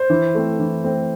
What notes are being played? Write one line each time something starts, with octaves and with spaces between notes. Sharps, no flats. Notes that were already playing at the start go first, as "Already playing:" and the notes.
Already playing: C5
E3
A3 C4
E3
A3 C4